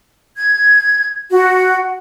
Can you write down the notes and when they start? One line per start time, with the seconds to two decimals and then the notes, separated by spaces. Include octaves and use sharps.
0.36 G#6
1.30 F#4